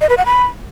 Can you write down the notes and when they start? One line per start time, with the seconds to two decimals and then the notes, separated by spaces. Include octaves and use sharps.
0.01 D#5
0.09 B4
0.17 F#5
0.26 B5